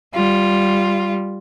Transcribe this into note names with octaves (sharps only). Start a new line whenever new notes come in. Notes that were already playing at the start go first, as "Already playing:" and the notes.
G3 F4